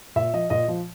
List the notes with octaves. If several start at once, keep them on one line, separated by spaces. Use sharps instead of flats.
A#2 E5
F3 D#5
A#2 D#5
F3